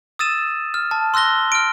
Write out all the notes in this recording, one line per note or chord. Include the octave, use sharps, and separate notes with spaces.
D#6 E6 A6 D#7 E7
F6
A5
C6 E6 F#6 A#6 G7
F6 D7